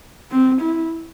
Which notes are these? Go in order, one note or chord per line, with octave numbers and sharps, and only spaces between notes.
C4
E4